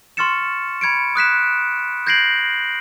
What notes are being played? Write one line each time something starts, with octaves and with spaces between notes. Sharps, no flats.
C6 C#6 F6 A6 C#7 E7
B5 G#6 C#7 D7
D#6 F#6 B6 E7
G6 G#6 A#6 C7 D7 F#7